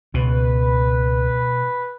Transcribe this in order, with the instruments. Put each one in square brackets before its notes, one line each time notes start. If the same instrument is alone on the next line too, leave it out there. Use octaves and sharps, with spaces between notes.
[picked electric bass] C#2 [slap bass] B2 [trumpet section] B4